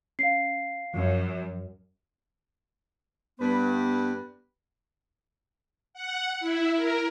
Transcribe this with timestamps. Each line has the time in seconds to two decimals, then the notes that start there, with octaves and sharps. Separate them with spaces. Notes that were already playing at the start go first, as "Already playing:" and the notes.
0.19 C#4 F5 C7
0.94 F#2 F3 F#3
3.39 G2 B3 B4
5.94 F#5
6.40 E4
6.75 A#4